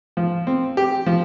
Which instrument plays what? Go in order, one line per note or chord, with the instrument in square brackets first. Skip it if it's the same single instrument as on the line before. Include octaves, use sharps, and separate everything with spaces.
[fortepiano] F3
C4
G4
F3